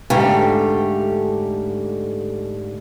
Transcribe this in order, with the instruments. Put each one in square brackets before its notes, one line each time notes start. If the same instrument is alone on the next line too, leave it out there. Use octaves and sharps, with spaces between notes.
[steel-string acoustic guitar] G#2 D3 A3 G4 F5